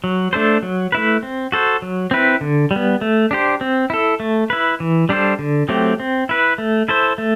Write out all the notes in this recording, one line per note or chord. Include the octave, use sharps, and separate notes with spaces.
F#3
A3 D4 A4 C5
F#3
A3 E4 B4
C4
F#4 A4 C5
F#3
C4 E4 B4
D3
G3
B3
A3
D4 G4 C5
C4
E4 A4
A3
E4 B4
E3
G3 D4 A4 C5
D3
F#3 A3 C4 G4
C4
E4 B4
A3
E4 A4 C5
A3